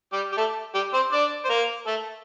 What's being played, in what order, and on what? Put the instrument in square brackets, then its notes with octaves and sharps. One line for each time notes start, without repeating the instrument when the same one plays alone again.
[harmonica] G3 G4
G4
A3 A4
G3 G4
C4 C5
D4 D5
C5
A#3 A#4
A3 A4